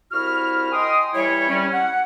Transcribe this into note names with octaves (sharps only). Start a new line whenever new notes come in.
C2 E4 F#4 F6
D#5 G5 G#5 C6 D#6
E3 G3 E4 G4 C#5
G3 C#4
F#5